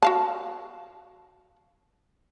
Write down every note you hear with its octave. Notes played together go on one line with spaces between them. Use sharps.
F#4 F5 A5